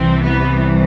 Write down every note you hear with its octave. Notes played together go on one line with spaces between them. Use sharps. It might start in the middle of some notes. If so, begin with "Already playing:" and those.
Already playing: C2 C3 E3 C4
B3